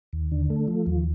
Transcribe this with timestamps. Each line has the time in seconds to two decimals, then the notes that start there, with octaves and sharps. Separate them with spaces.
0.13 D#2
0.32 D3
0.50 A3
0.68 F3
0.87 D#2